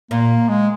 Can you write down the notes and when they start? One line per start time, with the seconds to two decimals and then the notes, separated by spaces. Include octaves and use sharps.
0.11 A#2 A#3
0.48 G#3